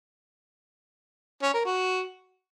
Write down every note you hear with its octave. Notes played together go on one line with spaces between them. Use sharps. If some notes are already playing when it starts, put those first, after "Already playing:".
C#4
A#4
F#4